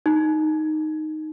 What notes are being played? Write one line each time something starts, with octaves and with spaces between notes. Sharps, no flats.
D#4